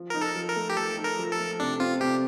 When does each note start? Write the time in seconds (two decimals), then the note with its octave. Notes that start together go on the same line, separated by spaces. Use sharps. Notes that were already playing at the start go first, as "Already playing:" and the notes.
Already playing: F3
0.10 D#4 A#4
0.22 A4
0.35 F3
0.49 A#4
0.56 A3
0.70 G4
0.77 F3 A4
0.97 D#4
1.04 A#4
1.19 F3
1.32 A4
1.39 A3
1.60 C3 D4
1.80 C4 F4
2.00 C3 G4